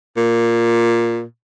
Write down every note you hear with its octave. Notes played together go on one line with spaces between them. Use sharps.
A#2